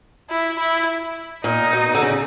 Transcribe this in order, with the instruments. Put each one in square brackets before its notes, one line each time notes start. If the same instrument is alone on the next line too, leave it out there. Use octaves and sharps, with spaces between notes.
[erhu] E4
E4
[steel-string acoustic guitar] A#2 [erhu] D#4
[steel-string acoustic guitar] B2
D3
C#3